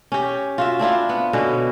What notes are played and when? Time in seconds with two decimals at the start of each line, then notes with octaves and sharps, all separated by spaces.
0.12 C#4 G4
0.58 F4 F#4 E5
0.79 C4 D4 E4 F4
1.09 B3
1.33 B2 D3 C#4 F#4